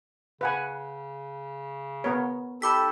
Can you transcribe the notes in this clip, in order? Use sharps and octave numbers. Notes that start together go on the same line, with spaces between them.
C#3 B4 F#5 G#5
B3 A#4 C#5
D#4 G4 A4 B5 D6 B6